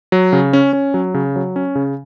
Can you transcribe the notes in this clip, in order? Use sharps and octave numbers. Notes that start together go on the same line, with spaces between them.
F#3
C#3
C#4
C#4
F#3
C#3
F#3
C#4
C#3